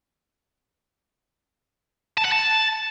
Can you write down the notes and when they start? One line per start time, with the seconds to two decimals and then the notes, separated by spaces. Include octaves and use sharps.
2.18 A5
2.25 F#5
2.32 A5